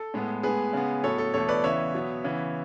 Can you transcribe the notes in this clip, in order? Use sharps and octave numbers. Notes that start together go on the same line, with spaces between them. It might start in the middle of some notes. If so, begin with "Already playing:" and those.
Already playing: A4
A2 G#3 B3
A2 G#3 B3 G#4 B4
C#3 G#3 B3
A2 F#3 B3 A4 C#5
A4
E2 B2 A3 A4 C#5
B4 D5
C#3 E3 B3 C#5 E5
B2 F#3 B3
C#3 E3 B3